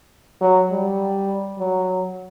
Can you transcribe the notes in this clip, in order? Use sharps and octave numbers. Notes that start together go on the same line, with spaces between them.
F#3
G3
F#3